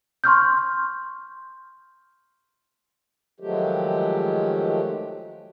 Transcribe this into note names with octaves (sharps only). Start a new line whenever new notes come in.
C6 C#6 F6 G6
D#3 F3 F#3 G#3 A3 G4